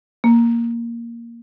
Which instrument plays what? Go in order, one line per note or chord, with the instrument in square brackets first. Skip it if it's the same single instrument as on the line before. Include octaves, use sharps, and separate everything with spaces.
[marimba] A#3